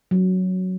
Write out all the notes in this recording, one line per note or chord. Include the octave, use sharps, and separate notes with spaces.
F#3